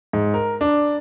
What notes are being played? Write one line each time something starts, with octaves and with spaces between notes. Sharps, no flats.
G#2
A#4
D4